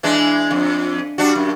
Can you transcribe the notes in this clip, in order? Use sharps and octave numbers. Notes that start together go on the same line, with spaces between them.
E3 G#3 D4
F2
G3 D4 F#4
F#2